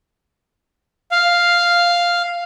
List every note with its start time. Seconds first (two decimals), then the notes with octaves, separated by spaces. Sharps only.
1.12 F5